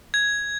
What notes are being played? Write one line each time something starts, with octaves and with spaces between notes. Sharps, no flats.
G#6